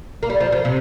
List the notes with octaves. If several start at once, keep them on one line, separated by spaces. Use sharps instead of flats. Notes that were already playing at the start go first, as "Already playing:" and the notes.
A#3
G3
F3
F3
C3